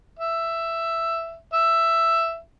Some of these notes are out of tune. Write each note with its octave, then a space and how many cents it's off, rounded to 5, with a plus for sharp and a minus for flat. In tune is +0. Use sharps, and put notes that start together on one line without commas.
E5 +10
E5 +10